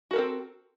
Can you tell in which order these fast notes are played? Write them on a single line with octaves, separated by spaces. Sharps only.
F#4 A#4 A4 C4